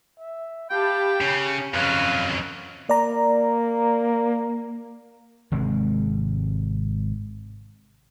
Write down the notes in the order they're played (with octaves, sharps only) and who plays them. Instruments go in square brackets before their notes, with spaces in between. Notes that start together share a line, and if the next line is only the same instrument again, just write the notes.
[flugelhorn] E5
[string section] G4 A5 B5 [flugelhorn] F5 [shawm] G5
[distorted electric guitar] C#3 [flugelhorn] C#4
[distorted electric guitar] F2 F#3 [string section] C#3 F6 [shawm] B4 [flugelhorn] F5
[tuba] A#3 [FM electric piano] D5 A#5
[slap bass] G#1 C3 G#3